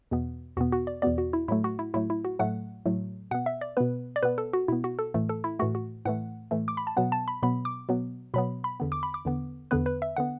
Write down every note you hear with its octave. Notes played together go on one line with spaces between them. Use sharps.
E2 B2 B3
E2 B2 B3 F#4
F#4
D5
E2 B2 B3 D5
F#4
E4
A2 F#3 A3 E4
F#4
E4
A2 F#3 A3 E4
E4
F#4
A2 F#3 A3 F#5
A2 F#3 A3
B2 B3 F#5
E5
D5
B2 B3 B4
D5
B2 B3 B4
A4
F#4
B2 B3 E4
F#4
A4
A2 E3 A3
A4
E4
A2 E3 A3 F#4
F#4
A2 E3 A3 F#5
A2 E3 A3
D6
B5
A5
B2 F#3 B3 F#5
A5
B5
B2 F#3 B3 B5
D6
B2 F#3 B3
B2 F#3 B3 B5
B5
E2 D3 B3
D6
B5
D6
E2 D3 B3
E2 D3 B3 B4
B4
E5
D3 B3 F#5